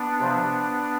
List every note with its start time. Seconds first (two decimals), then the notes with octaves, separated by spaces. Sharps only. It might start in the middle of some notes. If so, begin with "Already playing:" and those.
Already playing: B3 D4
0.19 C3 F3